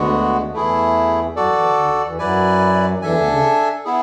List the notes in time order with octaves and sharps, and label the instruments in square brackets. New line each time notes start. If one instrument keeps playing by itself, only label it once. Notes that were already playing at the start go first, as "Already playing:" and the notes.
Already playing: [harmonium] D2 D3 [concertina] G#3 B3 F#4
[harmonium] D3
[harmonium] E2 E3 [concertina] A3 E4 G#4
[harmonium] F#2 F#3 [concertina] F#4 A4 D5
[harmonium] E2 E3
E2 E3
D2 D3
D2 D3
E2 E3
[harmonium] F#2 F#3 [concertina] E4 B4 D5 G#5
[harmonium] E2 E3 [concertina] D4 A4 E5 G#5
[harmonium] D2 D3
C#3
[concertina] B3 E4 G#4